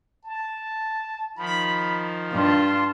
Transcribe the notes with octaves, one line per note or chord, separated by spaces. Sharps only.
A5
D#3 F3 B5
G2 F4 A5 C6